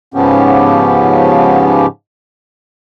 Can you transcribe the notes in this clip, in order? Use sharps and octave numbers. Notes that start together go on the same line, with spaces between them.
G#2 C#3 F3 B3 C#4 G4